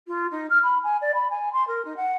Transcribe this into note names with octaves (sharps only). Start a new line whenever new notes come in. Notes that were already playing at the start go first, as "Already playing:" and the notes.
F4
D#4
F6
B5
G#5
D5
B5
G#5
C6
A#4
D#4
F#5